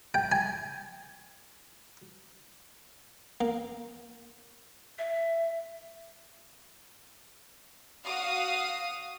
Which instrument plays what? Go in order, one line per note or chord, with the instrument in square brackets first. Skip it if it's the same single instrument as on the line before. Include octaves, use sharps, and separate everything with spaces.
[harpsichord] G5
G#5
A#3
[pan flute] E5
[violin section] F#4 F5 D#6